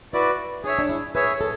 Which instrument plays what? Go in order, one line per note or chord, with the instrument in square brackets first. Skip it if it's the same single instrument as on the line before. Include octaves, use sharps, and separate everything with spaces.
[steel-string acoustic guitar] E4 [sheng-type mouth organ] F#4 B4 D5
[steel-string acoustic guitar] D4 [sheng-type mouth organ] G#4 C#5 E5
[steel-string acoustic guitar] D4
E4
[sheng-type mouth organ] G#4 C#5 E5 [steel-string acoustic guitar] B4
[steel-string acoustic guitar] A4